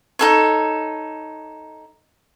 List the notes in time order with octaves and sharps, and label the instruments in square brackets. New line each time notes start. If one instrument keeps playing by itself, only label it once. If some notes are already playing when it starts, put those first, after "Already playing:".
[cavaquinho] D#4 A4 C#5